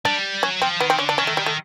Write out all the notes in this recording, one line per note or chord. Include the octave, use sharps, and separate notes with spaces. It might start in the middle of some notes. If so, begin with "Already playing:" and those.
G3 D4
F#3 C#4
F3 C4
D#3 B3
C4
D3 C#4
D4
D#3 C#4
A3
G3
A3